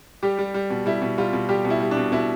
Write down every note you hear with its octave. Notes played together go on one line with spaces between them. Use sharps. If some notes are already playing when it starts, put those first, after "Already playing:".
G3 G4
G3
G3
B2
G3 E4
B2
G3 F4
B2
G3 G4
B2
E4
G3
D4
B2
B2 E4